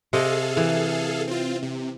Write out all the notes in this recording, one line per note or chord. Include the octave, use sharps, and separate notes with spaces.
C3 G#4 A4 D#5 F5
E3
C4 F4
C3